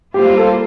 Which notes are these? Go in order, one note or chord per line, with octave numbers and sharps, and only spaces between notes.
G3 A#3 F4 G4 C5
A4